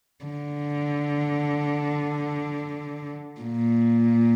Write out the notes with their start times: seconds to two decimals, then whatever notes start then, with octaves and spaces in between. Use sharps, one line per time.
0.25 D3
3.41 A#2